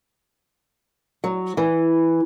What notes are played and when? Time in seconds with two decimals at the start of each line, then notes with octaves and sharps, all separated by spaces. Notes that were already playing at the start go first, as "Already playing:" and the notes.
1.24 F#3
1.57 E3